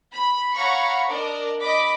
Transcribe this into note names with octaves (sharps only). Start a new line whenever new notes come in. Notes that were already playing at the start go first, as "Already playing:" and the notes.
B5
C#5 F5 F#5 A#5 B5 C#6
D4 A#4 D5 D#5
D#5 B5 D6 B6